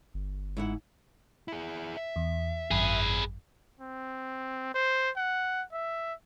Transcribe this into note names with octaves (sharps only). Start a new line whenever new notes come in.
G1
G#2 E4 F#5
E4 G#4
E5
E2
G#1 F#2 G#4 B4
C4
C5
F#5
E5